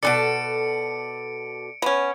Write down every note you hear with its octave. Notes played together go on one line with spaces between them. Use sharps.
B2 E3 A4 D5 C#7 D7
B3 C#4